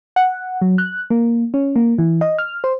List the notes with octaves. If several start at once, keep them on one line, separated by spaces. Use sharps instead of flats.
F#5
F#3
F#6
A#3
C#4
A#3
E3
D#5
F6
C5